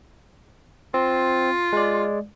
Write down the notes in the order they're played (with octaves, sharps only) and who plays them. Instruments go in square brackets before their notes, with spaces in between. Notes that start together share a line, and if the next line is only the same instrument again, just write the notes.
[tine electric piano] C4 [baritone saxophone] F4
[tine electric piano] G#3 D5